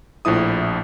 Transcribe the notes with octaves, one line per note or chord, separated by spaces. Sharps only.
A#1 A2 F3 E4 D#6